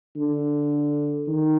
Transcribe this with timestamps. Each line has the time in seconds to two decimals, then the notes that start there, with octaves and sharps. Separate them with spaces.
0.16 D3
1.28 D#3